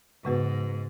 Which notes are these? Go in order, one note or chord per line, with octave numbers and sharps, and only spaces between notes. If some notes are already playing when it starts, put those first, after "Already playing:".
G#2 C#3 G#3 B3 F#4 B4